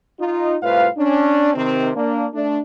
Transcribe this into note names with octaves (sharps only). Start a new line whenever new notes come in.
D#4 F4
C2 A2 F4 B4 C5 F5
C#4 D4
C3 D#3 C4
A#3 D4
A3 D4